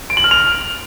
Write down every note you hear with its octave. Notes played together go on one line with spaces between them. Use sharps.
D7
F#7
F6
F7